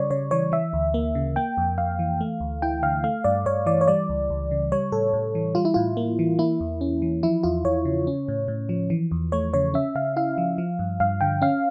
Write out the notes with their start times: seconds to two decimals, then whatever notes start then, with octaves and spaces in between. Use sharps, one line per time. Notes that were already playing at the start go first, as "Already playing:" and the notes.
Already playing: C#3 G3 C#5 D5
0.10 C#3 C#5
0.31 E3 C#5
0.52 E3 E5
0.73 D2
0.94 A#3
1.15 C#3
1.36 A#3 G5
1.57 F2
1.78 F2 F5
1.99 E3
2.21 A3
2.40 D2
2.62 E4 G5
2.83 D3 F5
3.04 A3 F5
3.24 G2 D5
3.46 G2 C#5
3.66 E3 D5
3.81 C#5
3.88 G3 D5
4.09 C#2
4.30 C#2
4.51 C#3
4.72 G3 C#5
4.92 A2 A4
5.13 A2
5.35 E3
5.55 G3 F4
5.65 E4
5.74 A2 F4
5.97 A#3
6.19 E3
6.39 A#3 E4
6.60 E2
6.81 C#4
7.02 E3
7.23 F3 E4
7.43 E2 F4
7.64 E2 C#5
7.85 C#3
8.07 C#4
8.28 A2
8.48 A2
8.69 F3
8.90 E3
9.11 E2
9.32 A3 C#5
9.53 C#3 C#5
9.74 C#4 E5
9.95 C#3 F5
10.16 E4 F5
10.38 F3
10.58 F3
10.79 G2
11.00 G2 F5
11.21 D3 G5
11.42 C#4 F5